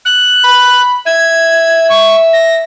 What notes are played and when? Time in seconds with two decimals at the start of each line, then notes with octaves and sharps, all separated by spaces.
0.05 F#6
0.44 B5
1.06 E5 G#6
1.90 C#6
2.33 A#6